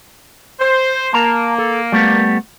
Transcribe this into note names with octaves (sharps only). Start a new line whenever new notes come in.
C5
A#3 A5 A#5
A4
G3 A3 B3